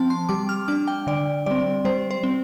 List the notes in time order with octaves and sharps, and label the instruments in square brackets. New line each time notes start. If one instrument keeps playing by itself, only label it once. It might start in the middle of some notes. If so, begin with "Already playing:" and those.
Already playing: [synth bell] F3 C4 A5 C6
C6
G3 D6
F6
D4 D6
G5
D3 D5
G3 C4 D5
G3 C5
C5
C4